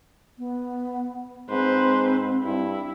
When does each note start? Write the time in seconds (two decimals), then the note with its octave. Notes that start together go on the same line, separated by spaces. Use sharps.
0.38 B3
1.50 G#2 C4 B4 C5
2.44 G2 E4